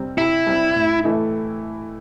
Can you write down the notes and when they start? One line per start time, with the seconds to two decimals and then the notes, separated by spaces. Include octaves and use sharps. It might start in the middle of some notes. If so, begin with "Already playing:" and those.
Already playing: C3 G3 C4
0.17 C3 E4
0.47 G3 C4
0.75 A2
1.04 E3 A3 E4 A4